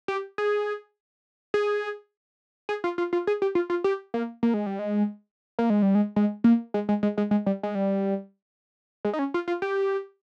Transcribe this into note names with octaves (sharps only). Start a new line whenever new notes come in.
G4
G#4
G#4
G#4
F4
F4
F4
G#4
G4
F4
F4
G4
A#3
A#3
G#3
G3
G#3
A#3
G#3
G3
G#3
G#3
A#3
G#3
G#3
G#3
G#3
G#3
G3
G#3
G3
G#3
D#4
C#4
F4
F4
G4